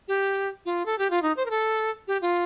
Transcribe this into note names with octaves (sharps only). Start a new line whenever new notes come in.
G4
F4
A4
G4
F4
D#4
C5
A#4
A4
G4
F4